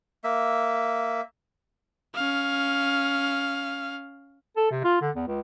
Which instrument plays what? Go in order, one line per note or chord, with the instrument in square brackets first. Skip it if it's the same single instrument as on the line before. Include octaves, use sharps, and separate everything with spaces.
[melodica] A#3 E5
[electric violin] C#4 F5
[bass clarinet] A4
C3
F4
D3
E2
C#2